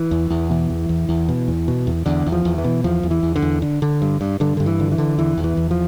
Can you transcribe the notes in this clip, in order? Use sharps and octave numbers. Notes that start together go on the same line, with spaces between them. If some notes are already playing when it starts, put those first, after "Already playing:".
Already playing: E3
E2
E2
B2 E3
E2
E2
E2
B2
E2
B2
E2
E2 D3
E2
F3
E2
E3
B2
E2 F3
E2
E3
E2
D3
E2
D3
D3
G2
G2
G2 D3
G2 D3
E3
D3
E3
D3
E2 E3
E2
E3
E2
F3